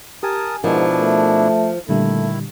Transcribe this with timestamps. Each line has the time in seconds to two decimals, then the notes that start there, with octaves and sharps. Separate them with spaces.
0.23 G4 A#4 G#5 A5 D#6
0.64 G#2 B2 F3 D4 E4 A#4 B4 G#5
0.99 A3
1.89 A#2 D3 D#3 G3 A3 E4